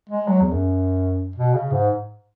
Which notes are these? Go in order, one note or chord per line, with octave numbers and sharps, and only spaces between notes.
G#3
F#3
E2
F#2
B2
C#3
G#2